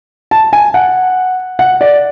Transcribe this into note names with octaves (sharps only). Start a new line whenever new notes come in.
A5
G#5
F#5
F#5
D5